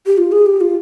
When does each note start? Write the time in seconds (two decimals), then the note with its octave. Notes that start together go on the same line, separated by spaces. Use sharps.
0.06 G4
0.18 F4
0.32 G#4
0.46 G4
0.61 F4